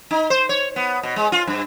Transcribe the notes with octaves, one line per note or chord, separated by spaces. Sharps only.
D#4
C5
C#5
B3
B2
G#3
F4
G2